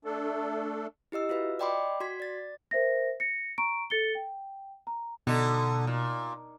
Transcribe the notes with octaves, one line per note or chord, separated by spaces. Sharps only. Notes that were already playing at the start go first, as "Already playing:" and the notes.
A3 D4 A4
E4 G4 D#5 E6
F4 F#4 B4 E5
D5 D#5 G5 B5 C6 D6
F#4 C6 G#6 B6
D5 A6
A#4 C5 E5 A#6
A#6 C#7
A#5 C#6 D7
A4 A6 C#7 G7
G5
A#5
B2 D3 D#4
A#2